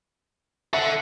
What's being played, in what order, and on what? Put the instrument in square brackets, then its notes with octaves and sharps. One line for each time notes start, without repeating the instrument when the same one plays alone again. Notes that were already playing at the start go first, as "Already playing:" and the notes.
[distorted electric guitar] A4 F#5 [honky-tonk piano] E5